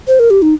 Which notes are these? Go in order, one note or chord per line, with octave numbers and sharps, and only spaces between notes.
C5
A#4
G4
D#4